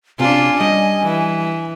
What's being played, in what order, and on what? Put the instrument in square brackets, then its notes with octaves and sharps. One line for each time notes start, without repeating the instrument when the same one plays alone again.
[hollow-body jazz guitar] C3 [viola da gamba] C#4 D4 F4 [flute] G#5
[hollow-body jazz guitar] G3 [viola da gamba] D#5
[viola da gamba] E3